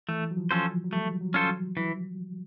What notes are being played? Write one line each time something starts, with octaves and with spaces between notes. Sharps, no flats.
E3 A3
F#3
F3
F3 C#4 F4 A4 C5
F#3
F#3
G3 A3
F#3
C#4 F4 A4 C5
F#3
E3